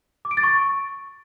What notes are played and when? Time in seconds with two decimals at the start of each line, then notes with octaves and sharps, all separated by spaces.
0.25 D6
0.31 D7
0.37 A6
0.43 C#6